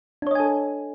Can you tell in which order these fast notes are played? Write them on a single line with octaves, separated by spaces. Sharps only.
D4 C#5 D#5 G#5 A4